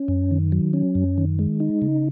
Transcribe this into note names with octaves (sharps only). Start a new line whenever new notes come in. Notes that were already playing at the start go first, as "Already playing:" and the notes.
Already playing: C#4
F#2
D#3
F#3
C#4
F#2
D#3
G#3
D#4
C#3